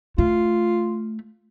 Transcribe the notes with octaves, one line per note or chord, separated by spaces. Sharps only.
A3 F4